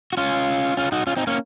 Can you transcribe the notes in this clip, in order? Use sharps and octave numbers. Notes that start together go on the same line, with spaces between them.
F#4
C#4 F4
C#4 F4
D#4 F#4
C#4 F4
C4 D#4
A#3 C#4